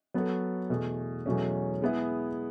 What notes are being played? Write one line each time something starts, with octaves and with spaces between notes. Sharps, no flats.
F#3 B3 F#4 A4 C#5
E2 B2 A3
E2 B2 F#3 A3 C#4
G#3 B3 E4 G#4